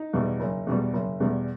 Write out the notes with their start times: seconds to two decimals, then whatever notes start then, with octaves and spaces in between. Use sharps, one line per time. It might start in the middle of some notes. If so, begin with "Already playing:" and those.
Already playing: D#4
0.13 E2 B2 G3
0.40 F#1
0.67 E2 B2 G3
0.93 F#1
1.20 E2 B2 G3